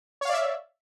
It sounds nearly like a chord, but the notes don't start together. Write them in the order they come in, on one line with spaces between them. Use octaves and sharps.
C#5 F5 D5 E5